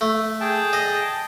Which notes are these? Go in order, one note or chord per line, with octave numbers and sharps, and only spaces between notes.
A3
G#4 G5 A5
D#5